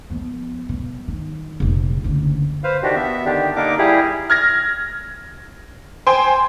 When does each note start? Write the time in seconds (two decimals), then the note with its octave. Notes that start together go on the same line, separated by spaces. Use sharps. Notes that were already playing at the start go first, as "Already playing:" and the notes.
0.10 F3 B3
0.69 B2
1.08 D#3
1.60 F1 A#1
2.04 F#1 D2
2.64 B4 C5 F5
2.83 D#3 D4 F#4 G4
2.96 B3 E5
3.25 D3 D#3 D4 G4
3.56 D3 A#3 D4 D#4 A#4 D6
3.78 G3 E4 G4 G#4
4.30 F6 G#6 A#6
6.07 C5 G5 G#5 C6